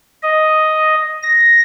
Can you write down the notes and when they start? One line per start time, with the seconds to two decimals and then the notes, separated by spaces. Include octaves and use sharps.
0.23 D#5
1.23 A#6